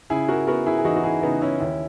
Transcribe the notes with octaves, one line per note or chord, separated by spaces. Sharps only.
C#3 E4 G#4
F#4 A#4
B3 F#4 A#4
E4 G#4
G#4
E3 D#4 F#4
F#4
E4 G#4
C#3 B3 D#4
C#4 E4
D#2 C#4 E4